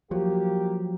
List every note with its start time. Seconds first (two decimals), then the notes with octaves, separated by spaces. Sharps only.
0.11 F3 F#3 A#3 G4